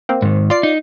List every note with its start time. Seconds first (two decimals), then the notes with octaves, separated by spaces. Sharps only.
0.09 A#3 C4
0.22 G#2 D#3
0.50 F4 D5 C7
0.63 D#4